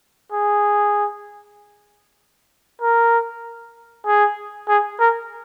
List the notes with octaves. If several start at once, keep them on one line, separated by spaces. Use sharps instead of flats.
G#4
A#4
G#4
G#4
A#4